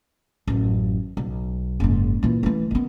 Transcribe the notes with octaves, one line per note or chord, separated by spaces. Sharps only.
A1 F#2
B1
F#1 G#2
A#2 E3
E3 A3
D#3 B3